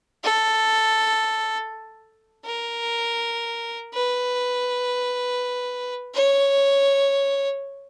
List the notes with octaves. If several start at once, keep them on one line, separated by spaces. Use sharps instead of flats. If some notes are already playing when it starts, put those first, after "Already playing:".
A4
A#4
B4
C#5